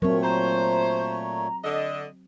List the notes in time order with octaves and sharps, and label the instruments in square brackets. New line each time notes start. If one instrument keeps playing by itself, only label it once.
[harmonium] A#2 A3 C#5 [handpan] F#3 C4 [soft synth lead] A#4
[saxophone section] C5 [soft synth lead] A#5
[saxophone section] D3 D#5